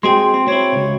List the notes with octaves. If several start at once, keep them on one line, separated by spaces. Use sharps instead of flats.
G#3 C4 F#4 G#4 G5 C6
C4
C4 E4 C#5
C#2